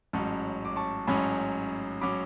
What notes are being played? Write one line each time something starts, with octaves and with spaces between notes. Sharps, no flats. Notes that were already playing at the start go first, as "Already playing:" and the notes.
A1 G#2 F#3 C#4 A5 C#6
D6
A5 C#6
A1 G#2 F#3 C#4 G#5 B5
F#3 C#4 B5 D6